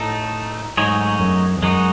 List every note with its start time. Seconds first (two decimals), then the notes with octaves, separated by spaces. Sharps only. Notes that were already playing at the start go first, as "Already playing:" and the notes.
Already playing: A2 A3 D#4 A4
0.77 G#2 F#3 A3 D#4 G#4 C#5
1.20 F#2
1.57 E2
1.63 F#2 G#3 D#4 F#4